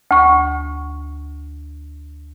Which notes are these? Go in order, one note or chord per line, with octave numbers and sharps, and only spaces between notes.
D2 C#6